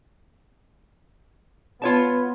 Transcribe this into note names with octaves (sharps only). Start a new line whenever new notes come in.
B3 F4 C#5 A5